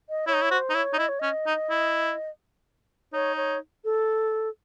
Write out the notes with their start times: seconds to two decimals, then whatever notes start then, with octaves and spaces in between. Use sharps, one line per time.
0.09 D#5
0.27 E4 C#5
0.34 D#4
0.42 E4
0.51 F#4 C5
0.70 D#4
0.74 E4 C#5
0.94 D#4
0.98 E4 D#5
1.09 C#5
1.19 C#4 D#5
1.47 D#4
1.70 E4
3.13 D#4 C#5
3.37 C#5
3.85 A4